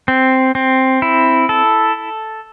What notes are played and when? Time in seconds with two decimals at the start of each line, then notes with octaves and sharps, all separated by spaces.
0.08 C4
0.55 C4
1.02 E4
1.49 A4